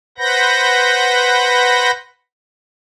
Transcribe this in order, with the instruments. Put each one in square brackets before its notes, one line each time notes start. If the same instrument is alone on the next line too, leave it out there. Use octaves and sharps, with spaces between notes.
[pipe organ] B4 C5 F#5 B5 G6 A#6